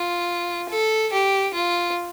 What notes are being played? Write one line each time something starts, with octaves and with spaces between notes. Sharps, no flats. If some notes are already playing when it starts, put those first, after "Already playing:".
Already playing: F4
A4
G4
F4